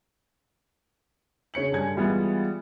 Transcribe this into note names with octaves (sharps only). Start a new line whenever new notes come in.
C#3 C#5 C#7 F#7
G2 D3 G#5 G#6
E3 G3 G#3 B3 F4